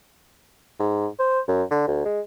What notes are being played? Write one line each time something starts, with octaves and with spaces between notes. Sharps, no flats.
G#2
C5
F#2
D3
D2
G#3